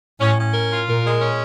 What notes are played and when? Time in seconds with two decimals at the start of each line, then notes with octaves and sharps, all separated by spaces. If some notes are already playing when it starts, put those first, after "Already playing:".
0.19 A2 C#4
0.36 C#4
0.53 A#4
0.70 F4
0.87 A#2 A#4
1.04 G#3
1.22 C#4